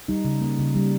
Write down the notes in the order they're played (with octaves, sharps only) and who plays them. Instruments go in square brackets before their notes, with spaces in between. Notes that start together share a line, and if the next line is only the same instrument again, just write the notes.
[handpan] G3 D#4
C#3
A#3
C#3
G3